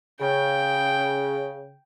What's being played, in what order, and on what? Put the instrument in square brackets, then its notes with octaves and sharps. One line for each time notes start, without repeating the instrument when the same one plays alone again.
[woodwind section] C#3 [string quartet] G5